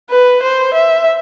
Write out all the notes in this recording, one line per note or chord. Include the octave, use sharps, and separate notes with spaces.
B4
C5
E5